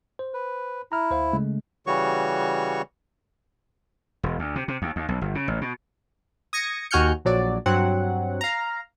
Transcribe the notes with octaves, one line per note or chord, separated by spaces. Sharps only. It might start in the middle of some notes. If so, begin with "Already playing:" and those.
C5
B4
E4 A#5 F6
D2 C5 F5
C#3 G#3 A3
C#3 E3 G3 F#4 C#5 C#6
E1
D2
C3
C3
D#2
D#2
B1
G1
C#3
A1
B2
D#6 G#6 A#6 C#7
D#2 F#4 G#5 F6 G6 C#7
A#1 F#3 D5
G2 F#3 C4 F#5
F5 A#5